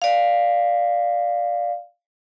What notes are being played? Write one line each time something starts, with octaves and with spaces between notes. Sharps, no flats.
D5 F5